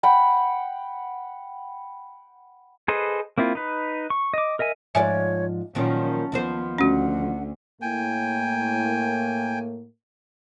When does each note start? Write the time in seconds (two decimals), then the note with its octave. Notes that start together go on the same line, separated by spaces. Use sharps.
0.03 F#5 G5 B5
2.88 G#4 A4 B4 C5 D#5
3.38 A#3 C4 E4 F4
3.55 D#4 B4
4.10 C#6
4.34 D#5 D6
4.59 A#4 D#5 E5 G#5
4.95 G#2 F3 C#5 D5 E5 G#5
5.75 A#2 D#3 F3 F#3 C#4 A5
6.32 D#2 F3 B3 C5
6.78 D2 C#4 F#4 F#5
7.82 A2 A#3 G5 G#5